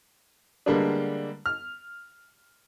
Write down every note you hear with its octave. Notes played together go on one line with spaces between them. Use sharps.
D3 G3 G#3 A#3 B3 D4
F6